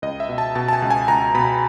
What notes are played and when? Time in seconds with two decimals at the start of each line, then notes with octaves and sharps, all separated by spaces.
0.02 C#2 D#5
0.20 E5
0.29 B2
0.38 A5
0.55 B2 A5
0.68 A5
0.73 G#5
0.82 C#2
0.90 G#5
1.08 C#2 A#5
1.35 B2 B5